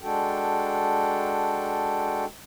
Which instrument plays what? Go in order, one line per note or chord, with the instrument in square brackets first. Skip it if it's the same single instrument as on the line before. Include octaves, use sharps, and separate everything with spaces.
[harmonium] G#3 D4 F#4 A4 G5